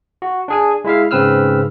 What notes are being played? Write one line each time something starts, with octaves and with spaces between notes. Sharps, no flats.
F#4
D4 G#4 G#5
G#3 E4 E5 F5
G#2 C#3 C4 B4 E6 F6